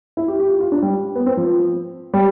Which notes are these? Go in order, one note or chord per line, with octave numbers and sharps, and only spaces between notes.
E4
G4
G4
F4
F4
D4
G3
B3
C4
F3
G3